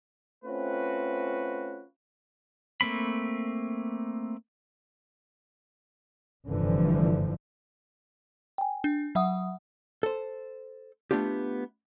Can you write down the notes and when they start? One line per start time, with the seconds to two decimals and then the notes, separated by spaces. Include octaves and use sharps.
0.45 A3 C4 C#4 F4 F#4 B4
2.81 A3 A#3 C4 B5
6.47 F1 G2 D3 E3 F3
8.58 G5 G#5
8.84 D4
9.15 F#3 E5 F#5 D#6
10.03 A4 C5
11.11 A3 B3 D4 F4 G4